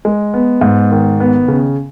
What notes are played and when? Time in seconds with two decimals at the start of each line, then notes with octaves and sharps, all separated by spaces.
0.05 G#3
0.34 B3
0.61 G#2
0.91 D#3
1.20 B3
1.48 C#3